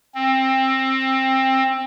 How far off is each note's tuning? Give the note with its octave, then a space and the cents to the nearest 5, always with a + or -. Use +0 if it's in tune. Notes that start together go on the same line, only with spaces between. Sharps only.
C4 +20